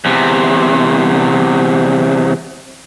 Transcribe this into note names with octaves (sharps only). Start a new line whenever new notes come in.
E2 C3